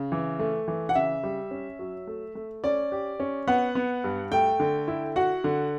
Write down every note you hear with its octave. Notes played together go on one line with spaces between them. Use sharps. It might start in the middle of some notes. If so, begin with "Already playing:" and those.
Already playing: C#3
E3
A3
E3
F#5
C#3 E5
G3
C#4
F#3
A3
A3
C#4 D5
G4
C#4
B3 F#5
B3
G2
A3 G5
D3
E4
F#4 F#5
D3